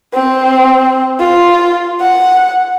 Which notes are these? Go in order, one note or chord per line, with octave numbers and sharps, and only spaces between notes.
C4
F4
F#5